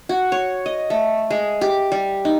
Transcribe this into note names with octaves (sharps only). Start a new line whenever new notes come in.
F#4
C#5
D#5
A3
G#3
G4
G3
D#4